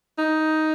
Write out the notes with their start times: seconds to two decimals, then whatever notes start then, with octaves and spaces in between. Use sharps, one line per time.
0.18 D#4